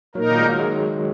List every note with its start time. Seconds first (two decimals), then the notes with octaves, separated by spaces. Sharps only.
0.15 A#2 F#3 A#3 D#4 A#4
0.30 D#3
0.39 G#3
0.45 F#3
0.59 G#3